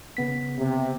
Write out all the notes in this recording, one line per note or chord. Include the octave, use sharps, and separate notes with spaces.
C#3 B3 B6
C3